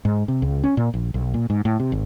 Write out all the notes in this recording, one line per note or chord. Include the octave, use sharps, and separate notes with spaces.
G#2
C3
C#2
C#4
A#2
A#1
B1
A#2
G#2
A2
C3
G#1